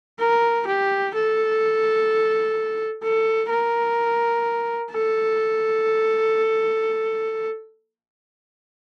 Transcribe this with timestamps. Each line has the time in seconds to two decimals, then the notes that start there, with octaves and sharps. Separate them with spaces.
0.19 A#4
0.67 G4
1.15 A4
3.03 A4
3.50 A#4
4.92 A4